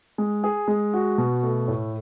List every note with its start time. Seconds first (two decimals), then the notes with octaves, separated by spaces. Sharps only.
0.18 G#3
0.44 G#4
0.68 G#3
0.94 F#4
1.18 B2
1.43 A3
1.68 A2